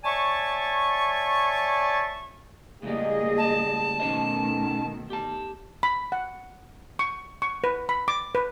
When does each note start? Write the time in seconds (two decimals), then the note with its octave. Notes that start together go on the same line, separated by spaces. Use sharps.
0.05 C#5 D5 E5 G#5 A5 C#6
2.83 C#2 A2 G3 A#3 G#4 D#5
3.38 A5
4.00 B2 D#3 A3 C#4 C5 D#5
5.10 G4 A5
5.83 B5
6.12 F#5
6.99 C#6
7.42 C#6
7.64 B4
7.89 B5
8.08 D6
8.35 B4